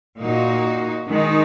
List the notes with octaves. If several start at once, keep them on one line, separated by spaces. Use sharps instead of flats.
A#2 A#3 D#4 F#4
D#3 G#3 D#4